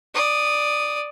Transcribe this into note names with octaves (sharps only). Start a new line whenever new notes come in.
D5 D#6